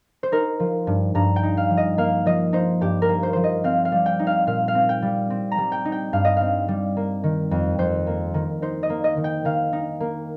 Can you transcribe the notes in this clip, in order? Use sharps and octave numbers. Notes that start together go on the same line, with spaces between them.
C5
D#4 A#4
F3
G2
G2 A#5
G5
D#4
F5
F3
D#5
A#3 F5
F3 D#5
D#4 C5
G2 G4
A#4
A#3
C5
F3 C5
D#5
C4 F5
F5
G3
G5
D#4
F5
A#2 F5
F5
C4
G5
G3
C4
A#5
G3
G5
D#4
G5
G2 F5
D#5
C4 F5
G3
A#3
D#3
F2
F2 C5
A#3
D#3
D#4 C5
D#5
A#3
D#5
D#3
G5
D#3 F5
D#4
A#3